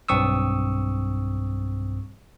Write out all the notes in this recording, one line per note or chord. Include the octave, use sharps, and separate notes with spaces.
B1 G2 C4 C#6 D#6 E6